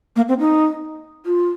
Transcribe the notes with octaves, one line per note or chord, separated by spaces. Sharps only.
A#3
C4
D#4
F4